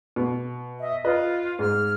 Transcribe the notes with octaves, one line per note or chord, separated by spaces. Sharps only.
B2
D#5 E5
F4 B4 D#5
G#2 F6